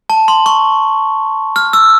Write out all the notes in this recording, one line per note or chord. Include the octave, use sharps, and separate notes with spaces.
A5
C6
C#6
F6
E6